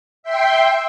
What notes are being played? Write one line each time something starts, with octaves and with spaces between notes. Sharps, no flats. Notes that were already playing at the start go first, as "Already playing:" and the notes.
E5 G5 C6